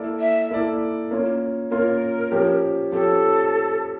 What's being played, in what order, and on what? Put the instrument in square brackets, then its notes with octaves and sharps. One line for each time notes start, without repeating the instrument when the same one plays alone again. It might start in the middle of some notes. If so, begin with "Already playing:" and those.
Already playing: [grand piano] A#3 E4 A4 D5
[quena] E5
[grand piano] A#3 E4 A4 D5
A#3 C#4 F4
[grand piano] A#3 C#4 F4 [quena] A#4
[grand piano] F3 C#4 G4
[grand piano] F3 C#4 G4 [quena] A4